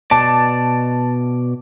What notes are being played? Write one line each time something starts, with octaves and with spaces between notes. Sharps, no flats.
B2 D5 A5